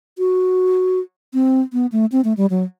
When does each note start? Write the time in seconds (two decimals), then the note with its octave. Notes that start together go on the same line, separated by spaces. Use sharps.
0.18 F#4
1.34 C4
1.73 B3
1.92 A3
2.12 C4
2.24 A3
2.37 G3
2.50 F#3